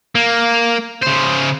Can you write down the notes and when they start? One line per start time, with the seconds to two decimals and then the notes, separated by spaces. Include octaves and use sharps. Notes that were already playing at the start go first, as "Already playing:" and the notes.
0.15 A#3
1.03 C#3 C5